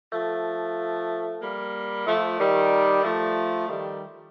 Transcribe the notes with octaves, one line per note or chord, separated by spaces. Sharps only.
F3 A3
G3 A#3
F3 A3
D#3 G3
F3 A3
D#3 G3